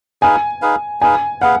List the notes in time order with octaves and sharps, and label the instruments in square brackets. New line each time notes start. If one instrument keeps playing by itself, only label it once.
[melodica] D#4 G#4 B4 F5 [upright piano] G#5
[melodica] D#4 G#4 B4 F5
[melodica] D#4 G#4 B4 F5 [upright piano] G#5
[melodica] G#4 B4 F5 [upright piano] F#5